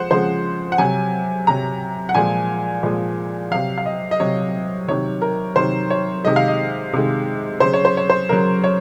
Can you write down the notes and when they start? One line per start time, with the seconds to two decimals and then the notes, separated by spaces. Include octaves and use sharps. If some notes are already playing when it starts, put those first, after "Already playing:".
Already playing: F3 G#3 C5 F#5
0.11 C#3 F3 G#3 C5
0.72 F#5
0.78 C3 F#3 G#5
1.47 C3 F#3 A#5
2.09 F#5
2.14 A#2 F3 G#3 G#5
2.83 A#2 F3 G#3
3.51 C3 F#3 F5
3.78 F5
3.86 D#5
4.11 D#5
4.20 C3 F#3 C#5
4.88 C3 D#3 F#3 C#5
5.22 A#4
5.56 C3 D#3 F#3 C5
5.90 C#5
6.24 C3 D#3 G#3 D#5
6.36 F5
6.48 D#5
6.93 C3 D#3 G#3
7.60 C#3 F#3 C5
7.73 C#5
7.85 C5
7.97 C#5
8.10 C5
8.29 C#3 F#3 A#4
8.64 C#5